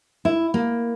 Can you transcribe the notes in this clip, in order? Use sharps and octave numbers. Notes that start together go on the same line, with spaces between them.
E4
A#3